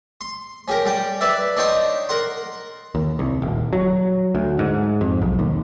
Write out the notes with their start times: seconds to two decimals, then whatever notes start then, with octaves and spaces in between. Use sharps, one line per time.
0.21 C6
0.68 C#4 G4 A#4
0.85 G3 G5
1.21 B4 D5 E5
1.57 D4 D#4 C#5 G5 C6
2.09 A#4 F#5 C6
2.95 D#2
3.19 C2
3.42 D#1
3.73 F#3
4.35 D2
4.59 G#2
5.01 F2
5.22 B1
5.39 D#2